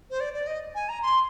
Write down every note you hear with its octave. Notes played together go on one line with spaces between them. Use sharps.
C5
D5
D5
D#5
G#5
A#5
C6